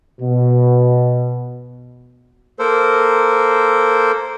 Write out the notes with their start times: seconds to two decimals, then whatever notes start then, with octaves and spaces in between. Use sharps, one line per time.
0.20 B2
2.59 A#3 A4 A#4 C5